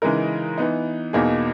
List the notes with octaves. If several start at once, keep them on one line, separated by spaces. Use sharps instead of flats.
C#3 E3 G#3 D#4 A#4
E3 B3 D#4
E2 B2 A#3 D#4 G#4